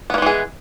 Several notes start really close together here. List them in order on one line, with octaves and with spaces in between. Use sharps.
B3 A#3 G#3 E3 G#4